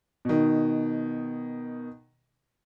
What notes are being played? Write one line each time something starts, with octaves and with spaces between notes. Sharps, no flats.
B2 D#3